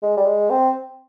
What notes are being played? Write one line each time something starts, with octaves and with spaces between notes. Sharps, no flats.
G#3
G3
G#3
C4